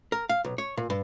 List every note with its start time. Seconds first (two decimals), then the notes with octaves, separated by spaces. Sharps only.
0.12 A#4
0.29 F5
0.45 B1
0.58 C#5
0.77 A#2
0.90 G2